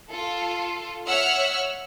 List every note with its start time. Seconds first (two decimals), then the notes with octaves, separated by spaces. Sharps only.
0.10 F4 A4
1.06 C#5 E5 F#5 E6 F6